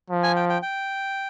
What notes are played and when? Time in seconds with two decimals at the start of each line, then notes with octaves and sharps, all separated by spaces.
0.10 F3
0.23 G#5
0.36 G5
0.49 G5
0.62 G5